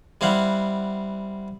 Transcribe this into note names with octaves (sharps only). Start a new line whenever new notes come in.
G3 C4 E4 F5 F#5